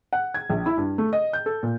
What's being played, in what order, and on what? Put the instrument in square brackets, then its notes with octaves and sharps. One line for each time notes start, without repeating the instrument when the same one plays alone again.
[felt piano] F#5
G#6
A#1
E4
G2
A3
D#5
G6
A4
A#2